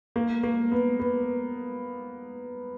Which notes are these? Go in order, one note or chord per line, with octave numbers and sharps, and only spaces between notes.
A#3
A#3
B3
B3